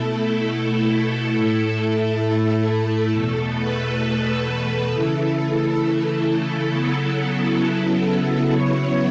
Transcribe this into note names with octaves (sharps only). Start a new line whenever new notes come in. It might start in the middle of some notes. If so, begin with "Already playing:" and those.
Already playing: B2 A3 E4 A4
A2 A3 E4
E2 B2 A3 A4
B4
A4
C#3 E3 A3 E4
C#3 F#3 B3 E4 A4
C#3 F#3 B3 E4 C#5